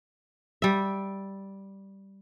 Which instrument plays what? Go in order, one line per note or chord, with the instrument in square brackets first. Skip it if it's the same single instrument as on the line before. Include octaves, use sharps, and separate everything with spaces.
[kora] G3 E5